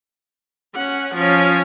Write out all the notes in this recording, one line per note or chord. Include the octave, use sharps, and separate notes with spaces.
C#4 F#5
F3 C#4